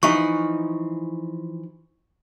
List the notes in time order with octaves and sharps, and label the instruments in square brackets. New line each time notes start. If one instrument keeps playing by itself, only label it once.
[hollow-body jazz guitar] E3 F3 D#4 [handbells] C#6